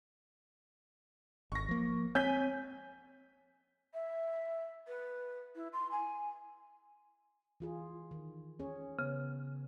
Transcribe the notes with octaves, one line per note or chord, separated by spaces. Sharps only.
G#1 C#6 A#6
F3 A#3
C4 C#5 G#5 G6 B6
E5
B4
E4
C6
G#5
E3 F4 G#4
D#3
C#4 G#4 C#5
C#3 B3